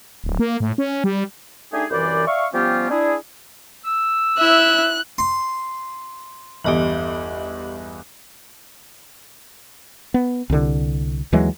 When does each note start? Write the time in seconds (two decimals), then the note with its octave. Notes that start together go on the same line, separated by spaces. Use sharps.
0.24 D1
0.39 A#3
0.60 A2
0.78 C#4
1.04 G3
1.72 A3 D4 D#4 G4 G#4
1.90 C2 F#2 E3 B4 C5 D5
2.26 D5 E5 F5 C#6
2.53 F3 G3 B3 C#4 F4 G4
2.90 D4 E4 G#4
3.84 E6
4.39 E4 E5 F#6
5.18 C6
6.64 G1 E2 G4 D#5 F#7
10.14 B3
10.50 C2 D3
11.32 D#2 E3 F#3 G#3